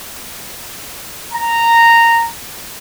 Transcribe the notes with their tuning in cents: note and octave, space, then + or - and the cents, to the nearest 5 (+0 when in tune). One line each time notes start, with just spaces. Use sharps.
A#5 -10